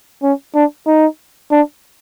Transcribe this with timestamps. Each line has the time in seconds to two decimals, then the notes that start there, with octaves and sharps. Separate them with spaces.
0.23 C#4
0.55 D4
0.87 D#4
1.51 D4